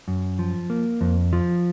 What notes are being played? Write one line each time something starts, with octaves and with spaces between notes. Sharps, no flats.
F#2
F3
A#3
F2
F3